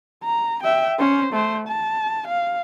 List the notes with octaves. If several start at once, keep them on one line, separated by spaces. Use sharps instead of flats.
A#5
E5 G5
C#4 C5
A3 C5
A5
F5